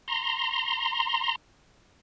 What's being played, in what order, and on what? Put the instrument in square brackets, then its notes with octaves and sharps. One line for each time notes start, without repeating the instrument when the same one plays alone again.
[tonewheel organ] A#5 C6